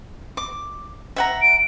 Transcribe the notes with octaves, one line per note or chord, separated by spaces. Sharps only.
D6
E5 F#5 A#5
D7